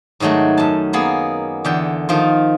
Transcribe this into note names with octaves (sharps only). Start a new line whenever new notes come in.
G#2 D#3 F#3 G#3 A3
F#2 A5
A#3 B3 G#4
E2 D3 G5
D#3 F3 F4